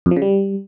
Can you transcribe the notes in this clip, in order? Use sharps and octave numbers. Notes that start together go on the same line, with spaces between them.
F2
F3
C#3
G3